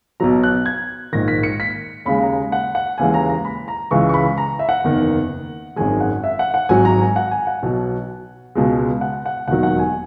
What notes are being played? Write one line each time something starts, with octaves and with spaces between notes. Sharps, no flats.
B1 B2 F#3 A#5
F#6
G#6
A#1 G#2 D#3 A#6
B6
C#7
B6
D#2 C#3 G#3 B5
A#5
F#5
F#5
D#2 C#3 E3 G#3 G#5
A#5
A#5
B5
A#5
C#2 C#3 E3 G#3 C#6
C#6
B5
A#5
E5
F#5
F#1 E2 D#3
G#1 F#2 D#3 G#3 G#5
F#5
E5
F#5
F#5
G#1 G#2 F#3 G#5
A#5
G#5
F#5
G#5
F#5
B1 B2 F#3
C#2 B2 G#3
F#5
F#5
E1 D#2 D#3 F#3 F#5
F#5
G#5